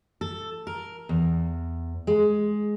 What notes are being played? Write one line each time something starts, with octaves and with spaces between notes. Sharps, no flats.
A4
A#4
E2
G#3